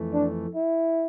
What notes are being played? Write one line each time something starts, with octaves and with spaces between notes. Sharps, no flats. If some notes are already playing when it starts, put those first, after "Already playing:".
Already playing: F2 E3 A3
D4
E4